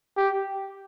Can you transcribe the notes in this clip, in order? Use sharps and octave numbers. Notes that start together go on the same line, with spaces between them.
G4